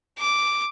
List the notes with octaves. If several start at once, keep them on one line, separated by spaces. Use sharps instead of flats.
D6